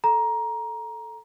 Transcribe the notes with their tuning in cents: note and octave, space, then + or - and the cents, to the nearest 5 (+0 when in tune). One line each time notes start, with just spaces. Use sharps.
A4 +0 A#5 +15